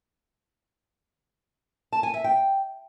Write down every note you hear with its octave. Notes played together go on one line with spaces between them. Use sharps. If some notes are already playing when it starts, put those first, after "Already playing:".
A5
G#5
E5
G5